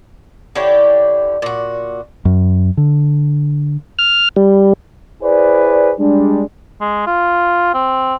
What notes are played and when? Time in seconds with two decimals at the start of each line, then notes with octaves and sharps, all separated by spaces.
0.55 D3 E4 G4 C#5
1.42 A#2 F#4
2.25 F#2
2.77 D3
3.99 F6
4.36 G3
5.22 E4 G#4 B4 C5 D5
5.99 G3 G#3 D4
6.81 G#3
7.07 F4
7.74 C4